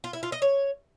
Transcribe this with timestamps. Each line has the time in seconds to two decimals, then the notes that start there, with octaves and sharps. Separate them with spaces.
0.04 F4
0.13 E4
0.23 F4
0.32 D#5
0.42 C#5